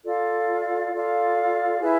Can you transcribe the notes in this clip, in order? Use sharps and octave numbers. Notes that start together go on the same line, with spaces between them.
F4 A4 D5 F5
F4 A4 D5 F5
E4 G#4 B4 E5